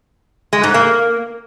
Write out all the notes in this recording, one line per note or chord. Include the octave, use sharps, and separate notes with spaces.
G#3
G#2
A#3